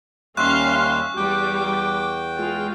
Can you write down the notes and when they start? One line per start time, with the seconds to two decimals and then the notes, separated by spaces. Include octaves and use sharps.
0.37 D#2 G3 C#4 E5 F5 C6 C#6 F#6
1.17 E2 G3 G5 D6 G6
2.38 G#3 F4